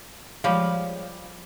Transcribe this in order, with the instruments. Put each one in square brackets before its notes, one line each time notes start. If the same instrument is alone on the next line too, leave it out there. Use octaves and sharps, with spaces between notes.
[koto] F3 G3 G4 [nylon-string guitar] G#3 C#5 F5